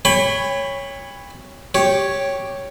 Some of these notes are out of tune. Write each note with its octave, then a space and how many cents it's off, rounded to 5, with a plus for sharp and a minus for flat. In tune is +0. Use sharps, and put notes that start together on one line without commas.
C#5 +0 G5 +45 B5 +10
G4 +0 C#5 +0